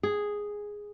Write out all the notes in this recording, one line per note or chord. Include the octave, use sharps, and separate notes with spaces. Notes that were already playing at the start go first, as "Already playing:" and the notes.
G#4